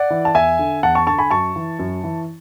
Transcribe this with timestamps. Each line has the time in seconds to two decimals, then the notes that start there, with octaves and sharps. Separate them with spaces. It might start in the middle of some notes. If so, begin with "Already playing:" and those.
Already playing: D5 F#5
0.10 E3
0.25 A5
0.35 E2 E5 G#5
0.59 D3
0.83 E2 F#5 A5
0.95 A5 C#6
1.07 D3 A5 C#6
1.19 G#5 B5
1.31 F#2 A5 C#6
1.56 E3
1.79 F#2
2.04 E3